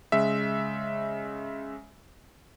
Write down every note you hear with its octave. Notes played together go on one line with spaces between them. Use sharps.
C#3 G#3 E5